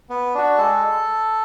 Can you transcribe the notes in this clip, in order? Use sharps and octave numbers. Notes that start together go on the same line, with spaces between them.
B3
D4 F#4
G#3 A4